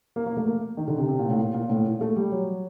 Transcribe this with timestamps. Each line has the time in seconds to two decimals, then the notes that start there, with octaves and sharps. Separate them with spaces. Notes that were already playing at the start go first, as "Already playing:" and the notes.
0.16 A#3
0.26 A#3
0.37 A3
0.47 A#3
0.77 D#3
0.88 D3
0.98 C3
1.09 C3
1.19 A#2
1.29 A2
1.39 A#2
1.54 A#2
1.70 A2
1.85 A#2
2.01 A3
2.16 G3
2.32 F#3